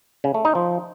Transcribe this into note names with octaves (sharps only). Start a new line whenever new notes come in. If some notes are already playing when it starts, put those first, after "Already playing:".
C#3
A3
D#4
F3